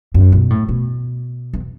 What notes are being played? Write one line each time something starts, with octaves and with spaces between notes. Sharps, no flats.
F#2
B2
A2
B2
E2